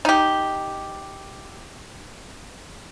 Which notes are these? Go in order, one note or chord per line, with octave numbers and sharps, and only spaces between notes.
D#4 G4